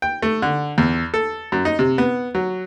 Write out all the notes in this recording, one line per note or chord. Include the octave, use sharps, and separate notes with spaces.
G5
A3
D3
E2
A4
F#2
D#4
C3
B3
F#3